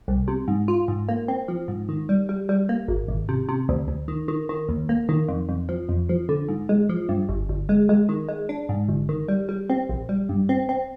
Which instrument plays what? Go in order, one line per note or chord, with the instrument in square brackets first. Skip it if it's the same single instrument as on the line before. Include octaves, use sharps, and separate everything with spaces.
[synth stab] C2
C3
G#2
F4
G#2
A#3
C4
F3
G#2
D#3
G3
G3
G3
A#3
G#1
G#1
C3
C3
D2
D2
D#3
D#3
D#3
D#2
A#3
D#3
F2
F2
F3
F2
F3
D3
G#2
G#3
F3
G2
G1
G1
G#3
G#3
D#3
G#3
D4
G#2
G1
D#3
G3
G3
C4
A#1
G3
G2
C4
C4